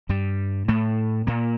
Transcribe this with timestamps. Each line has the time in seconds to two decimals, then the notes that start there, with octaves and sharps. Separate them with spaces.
0.09 G2 G3
0.68 A2 A3
1.27 A#2 A#3